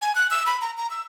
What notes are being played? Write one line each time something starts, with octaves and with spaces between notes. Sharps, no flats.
G#5
F#6
E6
B5
A#5
A#5
E6